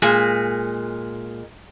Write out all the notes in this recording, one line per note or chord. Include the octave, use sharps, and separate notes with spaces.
A#2 G#3